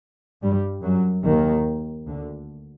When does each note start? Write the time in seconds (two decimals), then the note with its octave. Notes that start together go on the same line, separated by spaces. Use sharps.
0.42 G2 G3
0.84 F#2 F#3
1.25 D#2 D#3
2.07 D2 D3